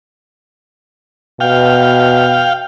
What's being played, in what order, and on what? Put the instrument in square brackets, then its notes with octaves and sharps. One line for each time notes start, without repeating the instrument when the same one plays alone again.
[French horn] B2 [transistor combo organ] F5 G5